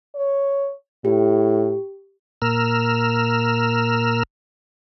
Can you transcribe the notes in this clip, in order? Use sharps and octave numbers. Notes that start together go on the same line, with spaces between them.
C#5
A2 G4
A#2 A#4 E6 F6